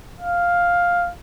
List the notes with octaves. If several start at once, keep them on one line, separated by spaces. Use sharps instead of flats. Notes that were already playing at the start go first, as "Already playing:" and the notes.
F5